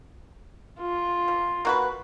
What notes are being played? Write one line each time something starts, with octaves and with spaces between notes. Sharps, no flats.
F4
F3
A#3 F#4 B4